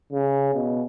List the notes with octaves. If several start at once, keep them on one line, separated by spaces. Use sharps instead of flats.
C#3
B2